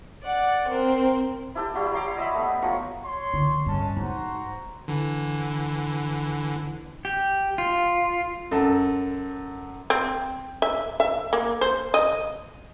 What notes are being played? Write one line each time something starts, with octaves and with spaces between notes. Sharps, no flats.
D5 F#5
C4 A#4
E4 G4 A4 G5
G3 E4 F#4 G4
C#5 A#5 C6 D6
D#5 E5 B5
A3 B3
F3 F#3 C#6
C#5 C6
D3 F3
G2 G#3 C#4 A5
G#2 F#4 C5 A#5
D3 E3
G4
F4
F#2 A4
C4
E5
E5
A#3
C5
D#5